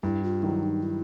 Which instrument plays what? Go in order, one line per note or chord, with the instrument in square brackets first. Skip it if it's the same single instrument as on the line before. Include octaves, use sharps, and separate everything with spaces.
[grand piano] G2 [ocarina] E4
[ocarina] F4
[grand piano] D#3 F#3 [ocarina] E4
[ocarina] D#4
E4